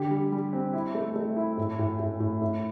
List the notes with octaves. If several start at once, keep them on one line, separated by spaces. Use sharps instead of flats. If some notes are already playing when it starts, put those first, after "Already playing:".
Already playing: D3 G4
G3
G3
C4
E4
A3
A3
E4
A2
A2
A2
A2
A2